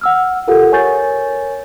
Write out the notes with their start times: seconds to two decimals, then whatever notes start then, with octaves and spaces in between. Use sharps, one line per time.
0.01 F#5 E6 F6
0.48 F4 G4 A4 A#4 F#5
0.72 A#4 C#5 G#5 C#6 G6 A6